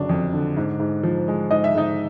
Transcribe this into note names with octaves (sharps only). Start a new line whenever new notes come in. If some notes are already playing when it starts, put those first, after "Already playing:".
Already playing: F#1 D3 F#3 D4
F2
D3
G#2
G#2
F3
G#3
G#2 D#5
E5
G#2 D#4 D#5